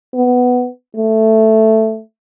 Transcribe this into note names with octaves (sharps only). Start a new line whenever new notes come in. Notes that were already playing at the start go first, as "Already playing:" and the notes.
B3
A3